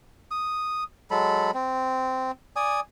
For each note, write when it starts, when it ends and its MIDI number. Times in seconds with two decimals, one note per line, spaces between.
0.31 0.84 87
1.11 1.51 54
1.11 1.51 56
1.11 1.51 69
1.11 1.51 83
1.54 2.31 60
2.56 2.80 74
2.56 2.80 80
2.56 2.80 87